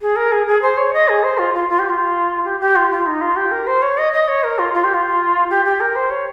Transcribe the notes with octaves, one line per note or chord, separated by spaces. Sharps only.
G#4
A#4
G#4
G#4
C5
C#5
D#5
G#4
C5
F4
F4
F4
G4
F4
G4
G4
F4
F4
D#4
F4
G4
A#4
C5
C#5
D#5
D#5
C#5
A#4
F4
F4
G4
F4
G4
G4
A#4
C5
C#5